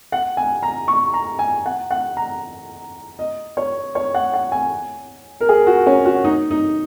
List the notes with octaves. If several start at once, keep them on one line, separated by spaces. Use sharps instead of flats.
F#5
G#5
A#5
C#6
A#5
G#5
F#5
F#5
A#5
D#5
C#5
C#5
F#5
F#5
G#5
A#4
G#4
F#4
C#4
F#4
D#4
D#4